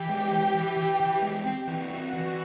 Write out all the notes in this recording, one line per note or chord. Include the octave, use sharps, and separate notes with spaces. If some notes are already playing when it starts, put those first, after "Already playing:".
Already playing: E3 G4
G#3
E3
E3
E3
E3
G#3
C4
E3 F#4
C4
E3